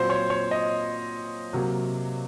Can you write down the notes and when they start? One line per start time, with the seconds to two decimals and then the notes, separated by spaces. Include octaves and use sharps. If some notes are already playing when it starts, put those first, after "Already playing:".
Already playing: A#2 F#3 C4 C5
0.10 C#5
0.30 C#5
0.51 D#5
1.53 C3 F#3 A#3